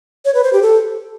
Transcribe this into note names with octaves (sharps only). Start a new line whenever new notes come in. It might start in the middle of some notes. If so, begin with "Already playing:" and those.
C#5
B4
C5
G4
A4